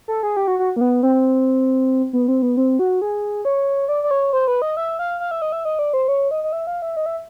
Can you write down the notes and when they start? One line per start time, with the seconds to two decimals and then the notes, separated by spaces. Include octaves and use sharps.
0.08 A4
0.23 G#4
0.37 G4
0.48 F#4
0.59 F#4
0.76 A#3
0.81 B3
1.03 C4
2.13 B3
2.28 C4
2.42 B3
2.57 C4
2.79 F#4
3.02 G#4
3.45 C#5
3.88 D5
4.04 D5
4.11 C#5
4.33 C5
4.48 B4
4.62 D#5
4.77 E5
4.99 F5
5.20 F5
5.31 E5
5.42 D#5
5.52 E5
5.65 D#5
5.79 D5
5.93 C5
6.08 C#5
6.31 D#5
6.44 D#5
6.52 E5
6.67 F5
6.82 E5
6.97 D#5
7.06 E5